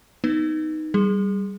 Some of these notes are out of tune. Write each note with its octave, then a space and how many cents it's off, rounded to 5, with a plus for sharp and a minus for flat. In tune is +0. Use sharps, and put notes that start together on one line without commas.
B3 +0 D#4 +0 B4 -5
G3 -5 G#4 +0